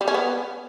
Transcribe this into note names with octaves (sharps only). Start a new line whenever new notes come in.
G3
C#4
B3